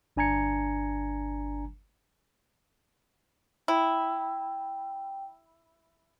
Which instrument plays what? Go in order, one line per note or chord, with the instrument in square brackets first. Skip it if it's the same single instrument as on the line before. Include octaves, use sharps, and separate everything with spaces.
[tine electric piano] G1 D4 G#5 A#5 G#6 C#7
[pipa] E4 [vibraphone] G5